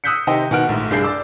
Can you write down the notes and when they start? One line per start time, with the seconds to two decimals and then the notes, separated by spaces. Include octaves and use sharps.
0.04 D#6 E6 F#6 G6 B6 C#7
0.27 C3 D#3 C5 D#5 G5
0.51 B2 D#3 F#5 F6 D7
0.69 A#1 G#2 A3
0.90 C2 G2 D4 G#4 G6 C7
1.02 D5 D6 E6